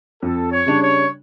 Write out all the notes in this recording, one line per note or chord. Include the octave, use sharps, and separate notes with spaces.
F2 A4
C#5
C#3 G3 D4
C#5